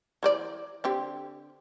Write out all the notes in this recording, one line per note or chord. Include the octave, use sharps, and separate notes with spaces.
E3 C5 D5
D3 C4 G4